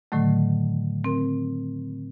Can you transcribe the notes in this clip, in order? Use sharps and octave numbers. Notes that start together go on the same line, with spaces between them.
A2 D3 D#3 F#3 A3
C4 A#4